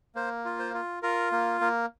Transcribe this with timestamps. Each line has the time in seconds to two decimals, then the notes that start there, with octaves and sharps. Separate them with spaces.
0.15 A#3 C5
0.45 F4
0.59 C5
0.74 F4
1.02 F4 A#4
1.32 A#3
1.61 A#3